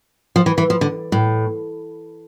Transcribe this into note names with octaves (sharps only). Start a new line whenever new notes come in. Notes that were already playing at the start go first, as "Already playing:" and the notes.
F3
E3
E3
F3
D3
A2